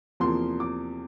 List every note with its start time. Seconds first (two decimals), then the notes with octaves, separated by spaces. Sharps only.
0.20 E2 C3 F3 A#3 C6
0.60 D6